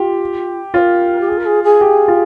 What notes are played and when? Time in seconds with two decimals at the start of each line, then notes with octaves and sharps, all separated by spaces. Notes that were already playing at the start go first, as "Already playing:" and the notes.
Already playing: F4 G4
0.74 F4 C#5
0.78 A#4
1.20 G4
1.28 G#4
1.38 A#4
1.45 G#4
1.64 G#4
1.81 G4
2.08 F4